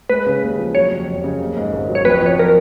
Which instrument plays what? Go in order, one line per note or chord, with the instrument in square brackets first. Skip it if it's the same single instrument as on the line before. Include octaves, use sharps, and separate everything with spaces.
[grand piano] G#3 [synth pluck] B4
[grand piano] C#3
D#2
F3
[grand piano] F#3 [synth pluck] C#5
[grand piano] F2
F1
C#3
A#3
G#2
G#1
F#3
[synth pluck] C#5
[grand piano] F2 [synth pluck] B4
[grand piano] F3 [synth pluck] C#5
[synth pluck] A#4